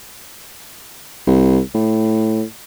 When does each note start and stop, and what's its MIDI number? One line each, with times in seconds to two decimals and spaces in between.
1.27 1.60 36
1.75 2.43 45